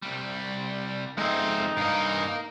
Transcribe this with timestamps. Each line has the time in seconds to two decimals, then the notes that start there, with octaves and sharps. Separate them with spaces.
0.02 C2 G3
1.18 F2 G#3 C4 D#4 E5
1.77 G2 A#4 D#5 F5